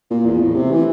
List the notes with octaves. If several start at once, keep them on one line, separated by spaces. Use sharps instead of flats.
A#2
E2
A2
C3
E3